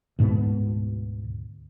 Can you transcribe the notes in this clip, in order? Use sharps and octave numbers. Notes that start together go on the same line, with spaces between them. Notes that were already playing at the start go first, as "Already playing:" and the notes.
D2 G#2 B2 B3